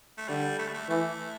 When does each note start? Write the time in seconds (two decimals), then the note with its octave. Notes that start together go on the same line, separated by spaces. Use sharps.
0.18 A3
0.28 D3 G3
0.59 A3
0.68 G3
0.74 A3
0.89 E3 A3